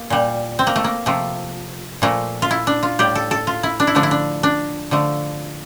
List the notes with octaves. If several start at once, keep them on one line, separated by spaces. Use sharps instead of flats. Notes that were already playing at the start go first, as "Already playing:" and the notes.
Already playing: A#3
A#2 G3
C4
A#3
A3
A#3
C3 F3 A3
A#2 F3 A3 A#3
F4
E4
D4
F4
A2 G3 G4
A4
A4
F4
E4
D4
E4
D3 F3 A3 D4
E4
D4
D4
D3 F3 A3